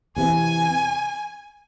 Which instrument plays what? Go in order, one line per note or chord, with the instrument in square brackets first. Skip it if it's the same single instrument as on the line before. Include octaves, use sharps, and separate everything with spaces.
[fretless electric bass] E2 C3 E3 [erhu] G#5